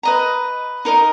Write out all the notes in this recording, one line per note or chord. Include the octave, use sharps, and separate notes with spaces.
B4 D#5 A#5
D#4 A#4 D#5